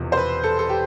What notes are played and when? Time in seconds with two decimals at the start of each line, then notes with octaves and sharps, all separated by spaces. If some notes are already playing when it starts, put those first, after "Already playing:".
Already playing: E1 E2 C3 F3
0.12 C5
0.17 B4
0.44 A4
0.59 A4
0.69 G4